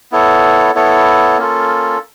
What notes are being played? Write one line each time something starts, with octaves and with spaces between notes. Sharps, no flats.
B3 E4 A4 C#5
B3 E4 A4 C#5
A#3 C#4 F4 A4